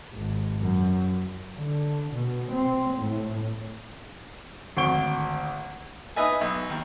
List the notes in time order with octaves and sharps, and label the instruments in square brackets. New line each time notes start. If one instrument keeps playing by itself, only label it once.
[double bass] G#1
F#2
D3
B2
C4
A2
[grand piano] G#1 D2 C#6 D7 G7
[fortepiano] D#4 B4 D#5 E5 G#5
B1
D#2